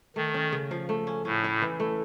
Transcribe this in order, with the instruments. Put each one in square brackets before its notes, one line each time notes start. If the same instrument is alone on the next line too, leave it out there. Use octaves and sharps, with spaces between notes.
[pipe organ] D#3 [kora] A3
[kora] C#4
C#3
F3
A3
C#4
[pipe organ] A2 [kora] C#4
[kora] E4
E3
A3